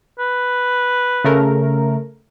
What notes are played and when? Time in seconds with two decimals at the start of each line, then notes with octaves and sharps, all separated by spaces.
0.19 B4
1.24 C#3 A3 A#4